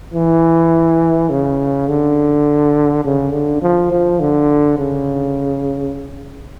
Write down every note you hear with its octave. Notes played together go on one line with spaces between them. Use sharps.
E3
C#3
D3
C#3
D3
F3
F3
D3
C#3